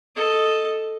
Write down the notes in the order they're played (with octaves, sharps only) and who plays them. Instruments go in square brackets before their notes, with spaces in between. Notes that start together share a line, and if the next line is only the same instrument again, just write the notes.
[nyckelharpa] A4 D#5